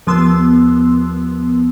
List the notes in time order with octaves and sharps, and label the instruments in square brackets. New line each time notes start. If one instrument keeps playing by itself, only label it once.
[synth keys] D#2 F3 B3 C6 E6